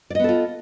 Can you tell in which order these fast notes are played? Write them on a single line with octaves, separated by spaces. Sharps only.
D5 D#5 B3 A4 F4